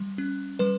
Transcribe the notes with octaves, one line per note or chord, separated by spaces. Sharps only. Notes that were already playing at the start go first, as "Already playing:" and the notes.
Already playing: G3
C#4
G3 B4